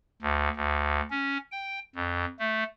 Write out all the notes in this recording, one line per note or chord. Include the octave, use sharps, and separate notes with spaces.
D2
D2
C#4
G5
F2
A3